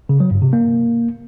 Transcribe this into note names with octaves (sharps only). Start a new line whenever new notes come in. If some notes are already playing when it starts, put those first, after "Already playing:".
C#3
F#3
G2
C3
A#3